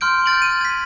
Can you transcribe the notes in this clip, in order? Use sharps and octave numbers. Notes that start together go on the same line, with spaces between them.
C6 F6 G6 D7
F6 G6 A6 D7 F#7
D#7
G#6 B6